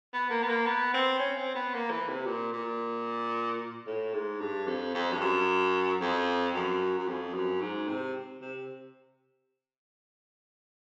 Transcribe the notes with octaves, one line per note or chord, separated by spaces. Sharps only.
B3
A#3
B3
A#3
B3
C4
C#4
C4
B3
A#3
E3
C3
A#2
A#2
A2
G#2
G2
F2
F2
G2
F#2
F2
F#2
F#2
F2
F#2
G#2
C3
C3